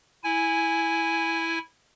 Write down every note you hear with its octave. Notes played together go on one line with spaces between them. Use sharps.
E4 G#5